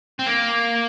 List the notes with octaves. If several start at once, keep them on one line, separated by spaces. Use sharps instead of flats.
C4
A#3